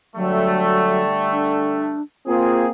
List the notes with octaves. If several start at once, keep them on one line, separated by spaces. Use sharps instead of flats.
D3 F#3 G3 A3
D4
A#3 C4 F4 G#4